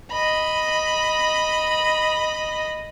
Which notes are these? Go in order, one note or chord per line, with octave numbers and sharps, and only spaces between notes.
D#5 B5